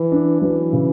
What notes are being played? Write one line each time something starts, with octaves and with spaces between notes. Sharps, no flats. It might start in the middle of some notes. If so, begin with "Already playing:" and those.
Already playing: E3
D4
E3 F#3
C#3